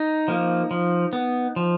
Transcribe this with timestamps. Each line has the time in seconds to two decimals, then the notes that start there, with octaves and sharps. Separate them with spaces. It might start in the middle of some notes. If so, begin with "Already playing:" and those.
Already playing: D#4
0.28 F3 A#3
0.71 F3
1.13 B3
1.56 F3